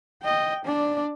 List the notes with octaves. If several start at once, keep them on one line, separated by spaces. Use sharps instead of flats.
D#5 G5
D4 D5